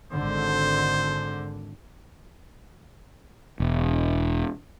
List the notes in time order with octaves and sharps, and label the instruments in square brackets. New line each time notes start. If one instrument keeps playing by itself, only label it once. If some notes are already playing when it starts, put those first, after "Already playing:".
[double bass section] G#1 D3 [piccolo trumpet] C5
[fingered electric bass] E1